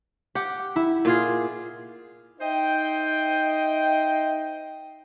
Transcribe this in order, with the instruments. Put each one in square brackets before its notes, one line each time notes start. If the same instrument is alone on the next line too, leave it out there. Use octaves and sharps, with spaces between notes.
[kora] G4 [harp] F#5
[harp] E4
[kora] A#2 F4 G#4
[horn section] D#4 C5 D#5 E5 G5